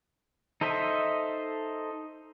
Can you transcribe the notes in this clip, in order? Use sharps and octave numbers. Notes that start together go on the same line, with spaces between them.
D#4 A4 C5 D#5 E5